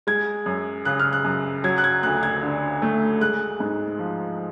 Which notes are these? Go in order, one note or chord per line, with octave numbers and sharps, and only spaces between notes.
G#3 G#6
F#2
C#3 F#6
F6
F#6
F#2
F#3 G#6
F#6
G#6
D2 F#6
G#6
D3
A3
G#3 F#6
G#2
F3